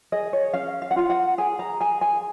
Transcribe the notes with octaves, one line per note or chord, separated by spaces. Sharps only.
G#4 D#5
C#5
C#4 F5
F5
F#5
F4 F5
F#5
G#4 G#5
A#5
G#4 G#5
G#5